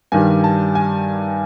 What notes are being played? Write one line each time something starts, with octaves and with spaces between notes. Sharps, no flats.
G2 D#3 G3 G#5
A5
G#5